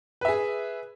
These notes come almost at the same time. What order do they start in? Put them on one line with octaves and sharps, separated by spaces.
B4 E5 G#4